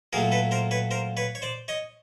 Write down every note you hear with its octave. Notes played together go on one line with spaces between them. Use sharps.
A#2 F#3 A3 G#4 A#4
A4 B4
A#4 C5
B4 C#5
A#4 C5
B4 C#5
C#5
C5 D5
C#5 D#5